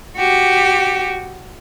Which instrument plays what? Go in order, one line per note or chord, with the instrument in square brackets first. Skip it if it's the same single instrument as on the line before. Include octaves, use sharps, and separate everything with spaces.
[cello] F#4 G4